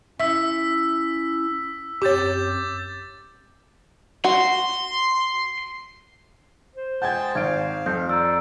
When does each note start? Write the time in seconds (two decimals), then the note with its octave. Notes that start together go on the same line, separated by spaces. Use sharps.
0.20 C#4 E4 E5 E6 B6
2.02 F#2 C4 G4 C#5 D6 G6 A6
4.24 F#4 C6
6.75 C5
7.02 G#3 F#5 G5 A5 G6 G#6
7.35 G#1 F5 G#6 D7
7.86 F2 F3 G6
8.09 D5 A#5 E6